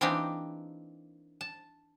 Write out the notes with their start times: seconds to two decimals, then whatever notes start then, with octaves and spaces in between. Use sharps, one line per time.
0.01 E3 A#3 C4 D4 D#4 G4
1.41 A5